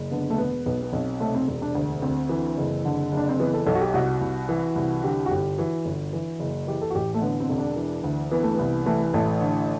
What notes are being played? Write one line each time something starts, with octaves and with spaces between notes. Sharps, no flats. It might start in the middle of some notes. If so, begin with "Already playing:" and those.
Already playing: F#1
D3 B3
A3
E1 B3
B1 B3
B3
B1 C4
C3 A3
C4
E1 C4
D4
D2
D2 C4
E3
F#1
D3
F#1 D4
C4
E3 B3
A4
B1 A4
F#4
G4
C2 F#4
C2
E3
C2
D3 G4
F#4
G1 G4
E3 F#4
G1
E3
F#1
E3 G4
A4
F#4
A1 G4
A3
D3 B3
C4
E1
D4
E3
D2
E3 B3
A3
C2 B3
E3 A3
A1 A3
D3